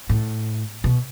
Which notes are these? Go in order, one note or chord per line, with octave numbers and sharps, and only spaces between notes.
A2
B2